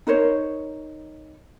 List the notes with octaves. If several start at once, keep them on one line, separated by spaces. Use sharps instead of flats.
D#4 A#4 C5 C#5